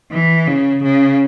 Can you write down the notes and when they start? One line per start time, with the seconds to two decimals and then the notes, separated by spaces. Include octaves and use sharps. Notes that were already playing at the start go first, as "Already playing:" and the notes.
0.11 E3
0.47 C#3
0.83 C#3